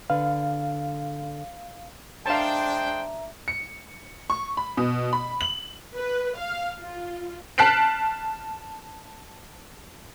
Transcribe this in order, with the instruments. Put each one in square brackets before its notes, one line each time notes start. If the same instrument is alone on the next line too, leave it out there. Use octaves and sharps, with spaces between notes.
[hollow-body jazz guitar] D3 B4 [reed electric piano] F5
[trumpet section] G#3 C5 G5 [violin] D4 [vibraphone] E5 A#5 [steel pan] F5 A5
[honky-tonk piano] C#7
C#6
B5
B2
B5
F#7
[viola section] B4
F5
F4
[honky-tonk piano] A5 F6 F#6 B6 C7 D7